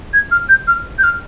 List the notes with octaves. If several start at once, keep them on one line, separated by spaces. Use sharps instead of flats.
G#6
F6
G6
F6
G6
F6